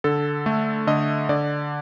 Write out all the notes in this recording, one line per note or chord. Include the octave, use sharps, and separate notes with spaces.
D3 A4
A3
D3 D#5
D3 D5